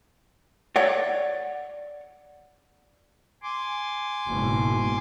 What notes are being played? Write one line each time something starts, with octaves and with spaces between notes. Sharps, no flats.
C#5 D5 F#5
G#5 C6 D6
F#1 G#2 B2